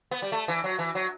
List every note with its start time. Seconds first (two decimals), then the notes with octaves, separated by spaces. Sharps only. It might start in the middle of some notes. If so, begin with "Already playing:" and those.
0.11 B3
0.22 G3
0.32 A3
0.48 E3
0.64 F#3
0.79 E3
0.95 F#3